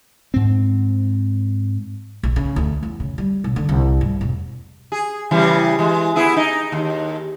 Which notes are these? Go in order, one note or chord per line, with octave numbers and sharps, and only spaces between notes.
G#2 C4
A#1
C#3
D2
E2
C#3
G3
B1
D3
C2
G2
E1
G#4
C#3 E3 G3
E3 G#3
B3 E4 G#4
D#4
D#2